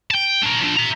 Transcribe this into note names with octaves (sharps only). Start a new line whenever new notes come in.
G5 A5
D4 A#4
F3 D4
E5 A#5